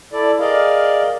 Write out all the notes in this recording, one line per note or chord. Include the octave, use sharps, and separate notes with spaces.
E4 A4 D5
G#4 A#4 D5 D#5 F5